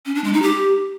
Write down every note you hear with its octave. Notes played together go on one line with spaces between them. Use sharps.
C#4
D4
G#3
D#4
G4